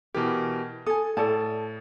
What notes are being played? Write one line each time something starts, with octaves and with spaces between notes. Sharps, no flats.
B2 E3 G4 A#4
A4 G#5 D#6
A2 A4 D5 A5